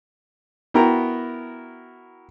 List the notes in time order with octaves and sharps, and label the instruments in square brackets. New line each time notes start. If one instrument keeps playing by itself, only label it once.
[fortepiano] B3 E4 F#4 A#4 G5 A#5